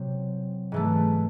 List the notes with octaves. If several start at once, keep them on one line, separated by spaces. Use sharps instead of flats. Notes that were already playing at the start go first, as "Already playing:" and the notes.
Already playing: C3 F#3 C4
G#2 E3 A3